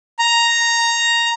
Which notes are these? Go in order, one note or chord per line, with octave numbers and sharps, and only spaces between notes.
A#5